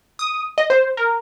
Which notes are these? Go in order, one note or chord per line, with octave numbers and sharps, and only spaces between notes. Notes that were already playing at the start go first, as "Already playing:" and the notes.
D#6
D#5
C5
A#4